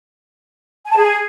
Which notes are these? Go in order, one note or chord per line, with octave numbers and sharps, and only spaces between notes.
G#5
A5
G#4